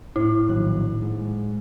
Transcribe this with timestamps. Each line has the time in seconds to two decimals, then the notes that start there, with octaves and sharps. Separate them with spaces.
0.16 A2 E4
0.48 A#1 D#3 F#3 F#6
1.02 G#2